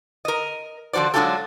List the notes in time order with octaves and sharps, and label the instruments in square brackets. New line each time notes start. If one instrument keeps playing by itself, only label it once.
[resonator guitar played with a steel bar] A#4 D#5
D3 F3 F#4 C5 D5
F#3 G#3 D4 F4 G4 A4